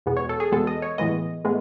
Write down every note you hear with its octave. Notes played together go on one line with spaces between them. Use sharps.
E2 B2 G#3 B3
C#5
A4
G#4
E2 B2 G#3 B3 A4
D#5
C#5
A2 E3 G#3 B3 D#5
A2 G#3 B3